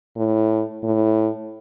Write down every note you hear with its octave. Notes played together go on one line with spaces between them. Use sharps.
A2
A2